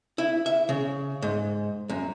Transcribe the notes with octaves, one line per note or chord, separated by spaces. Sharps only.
E4
E5
C#3
G#2
F#2